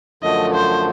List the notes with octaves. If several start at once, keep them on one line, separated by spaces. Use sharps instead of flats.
F#2 D3 F3 A3 D#5
C5